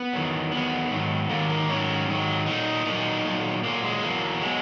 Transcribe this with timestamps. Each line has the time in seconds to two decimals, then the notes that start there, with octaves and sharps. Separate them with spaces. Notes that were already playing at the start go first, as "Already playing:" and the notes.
Already playing: B3
0.13 E2 D#3 F#3
0.51 E2 D#3 F#3 B3
0.91 G#2 D#3 F#3
1.29 G#2 D#3 F#3 A#3
1.50 A#3
1.69 G#2 D#3 F#3 C#4
2.08 G#2 D#3 F#3
2.46 A#2 F#3 D#4
2.86 A#2 F#3 D#4
3.24 A#2 F#3
3.63 A#2 F#3 A#3
3.83 G#3
4.02 E2 B2 F#3 A#3
4.41 B2 F#3 G#3